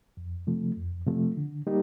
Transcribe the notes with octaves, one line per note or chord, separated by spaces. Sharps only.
F2
C3 F3 A3
F2
C3 F3 A3
D3
G3 A#3 D#4 G4